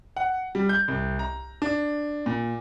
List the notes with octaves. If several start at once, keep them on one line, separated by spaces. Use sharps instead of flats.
F#5
G3
G6
C2
A#5
D4
A#2